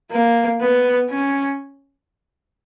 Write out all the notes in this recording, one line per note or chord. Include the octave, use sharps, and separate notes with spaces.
A#3
B3
C#4